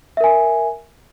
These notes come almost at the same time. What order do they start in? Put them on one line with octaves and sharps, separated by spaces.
E5 A#4 G#5